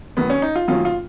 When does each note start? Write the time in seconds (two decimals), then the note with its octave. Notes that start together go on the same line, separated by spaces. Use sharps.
0.17 F#2 D#3 A#3 B3
0.30 C#4
0.42 D#4
0.56 F4
0.68 F#2 D#3 F#3 A#3 C#4 F4
0.85 F4